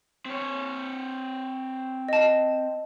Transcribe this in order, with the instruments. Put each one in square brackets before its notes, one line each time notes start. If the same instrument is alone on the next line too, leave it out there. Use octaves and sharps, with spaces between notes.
[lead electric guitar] C4 C#5
[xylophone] D#5 A5